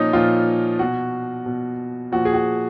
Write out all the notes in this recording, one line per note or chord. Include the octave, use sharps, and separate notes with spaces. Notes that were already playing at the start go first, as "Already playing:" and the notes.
Already playing: A#2 F3 C#4 D#4
A#2 F3 F4
B2 F#4
B2
A#2 F3 F#4
G#4
F#4